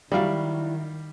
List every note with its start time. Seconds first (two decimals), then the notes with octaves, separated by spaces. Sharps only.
0.12 D#3 F#3 G3 E4 F#4 D5 F5